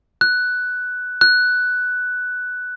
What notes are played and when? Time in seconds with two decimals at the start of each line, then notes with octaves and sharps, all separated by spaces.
0.21 F#6
1.21 F#6